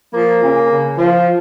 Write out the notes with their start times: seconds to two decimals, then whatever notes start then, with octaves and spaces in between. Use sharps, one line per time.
0.12 F3 A#3
0.41 C#3
0.69 C#3
0.98 F3